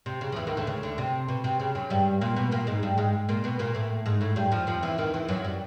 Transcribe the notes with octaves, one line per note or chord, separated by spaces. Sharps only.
C3
C#3
F3
E2 E3
D#2 D#3
D2 D3
C#3
D2 D3
C3
B2
C3
C#3
F#2 F#3
G2 G3
A#2 A#3
B2 B3
A#2 A#3
G#2 G#3
G2 G3
G#2 G#3
A#2 A#3
B2 B3
A#2 A#3
A2 A3
G#2 G#3
A2 A3
G2 G3
F2 F3
F2 F3
E2 E3
D#2 D#3
E2 E3
F#2 F#3
G3